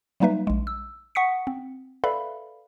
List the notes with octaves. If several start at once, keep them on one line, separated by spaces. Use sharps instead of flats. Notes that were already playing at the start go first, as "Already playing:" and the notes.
F#3 G3 A#3 D#4 B4 E5
A#1 G#3
E6
F#5 C#6 D#6 B6 C#7
C4
A4 B4 D5 E5 F5 B5